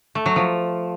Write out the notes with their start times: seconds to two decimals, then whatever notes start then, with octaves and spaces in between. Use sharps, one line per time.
0.15 A3
0.26 F#3
0.36 F3